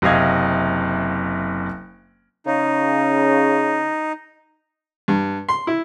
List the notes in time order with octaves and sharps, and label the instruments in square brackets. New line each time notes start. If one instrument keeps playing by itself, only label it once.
[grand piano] F#1 C3 D#5 F5 D#6 G#6
[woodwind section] C#3 [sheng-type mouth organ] D#4
[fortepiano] G2
C6
E4